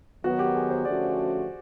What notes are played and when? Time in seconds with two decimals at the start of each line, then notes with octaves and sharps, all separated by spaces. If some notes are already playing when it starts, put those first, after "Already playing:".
0.23 D#3 F#3 B3 F#4
0.39 G4
0.55 G#4
0.70 C5
0.85 D3 F3 A3 C#4 F#4 D5